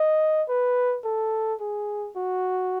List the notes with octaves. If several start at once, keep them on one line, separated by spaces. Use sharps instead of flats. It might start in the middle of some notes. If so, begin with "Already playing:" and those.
Already playing: D#5
B4
A4
G#4
F#4